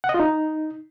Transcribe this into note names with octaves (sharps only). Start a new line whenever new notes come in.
F#5
D#5
F4
D#4